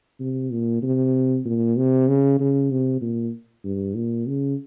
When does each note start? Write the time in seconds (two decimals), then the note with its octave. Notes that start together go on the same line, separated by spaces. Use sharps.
0.20 C3
0.51 A#2
0.82 C3
1.45 A#2
1.77 C3
2.08 C#3
2.39 C#3
2.71 C3
3.01 A#2
3.64 G2
3.96 A#2
4.27 C#3